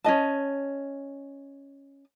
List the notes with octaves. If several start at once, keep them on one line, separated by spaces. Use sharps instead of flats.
C#4 D4 D#5 A5